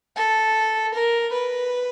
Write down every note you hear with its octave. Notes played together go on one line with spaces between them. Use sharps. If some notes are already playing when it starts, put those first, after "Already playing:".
A4
A#4
B4